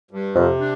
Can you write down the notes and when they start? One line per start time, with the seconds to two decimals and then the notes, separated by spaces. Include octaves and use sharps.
0.11 G2
0.35 F2 C3
0.60 D4